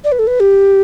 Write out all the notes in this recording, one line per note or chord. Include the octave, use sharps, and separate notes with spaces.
D5
B4
A4
B4
G4